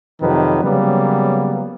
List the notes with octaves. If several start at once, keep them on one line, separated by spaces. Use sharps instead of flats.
F2 C3 D#3 F#3 B4
C#3 F#3 G3 A#3 B3